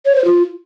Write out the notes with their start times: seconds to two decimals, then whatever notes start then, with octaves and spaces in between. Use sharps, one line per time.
0.06 C#5
0.15 C5
0.25 F4